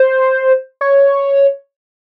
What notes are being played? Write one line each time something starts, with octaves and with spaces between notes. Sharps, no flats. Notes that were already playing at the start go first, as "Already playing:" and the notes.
Already playing: C5
C#5